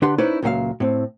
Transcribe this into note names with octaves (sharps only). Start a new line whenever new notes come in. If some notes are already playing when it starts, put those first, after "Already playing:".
D3 D4 G4 B4 F#5 C6
C#4 D#4 E4 B4 C5 D5
C#2 A#2 F#3 F#4 E5 F5
A2 C4